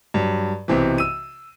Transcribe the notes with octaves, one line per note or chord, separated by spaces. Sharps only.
G2 F#3
B1 C3 E3
E6 D#7